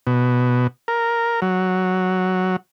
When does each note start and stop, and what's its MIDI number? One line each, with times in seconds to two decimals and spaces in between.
0.07 0.67 47
0.88 1.40 70
1.42 2.56 54